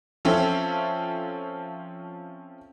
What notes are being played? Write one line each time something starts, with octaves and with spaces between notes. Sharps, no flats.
F3 C4 C#4 A4 E5